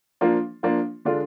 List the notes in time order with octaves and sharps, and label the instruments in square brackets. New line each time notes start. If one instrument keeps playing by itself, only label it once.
[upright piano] F3 A#3 D4 F4
F3 A#3 D4 F4
D3 G#3 D4 F4